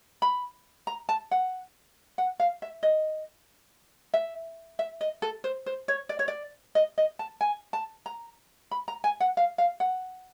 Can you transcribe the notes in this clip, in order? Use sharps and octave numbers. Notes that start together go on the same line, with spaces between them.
B5
A#5
A5
F#5
F#5
F5
E5
D#5
E5
E5
D#5
A4
C5
C5
C#5
D5
C#5
D5
D#5
D#5
A5
G#5
A5
A#5
B5
A#5
G#5
F#5
F5
F5
F#5